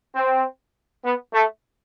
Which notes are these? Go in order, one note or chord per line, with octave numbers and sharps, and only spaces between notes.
C4
B3
A3